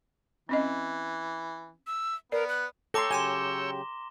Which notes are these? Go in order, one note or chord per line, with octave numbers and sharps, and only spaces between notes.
E3 C4 C#4 D#5
E6
B3 A#4 D5
F#6
A4 C#5 G5 A#5 C6 D6 E6 A#6
C#3 F#3 G4 G#5 C6 E7 G7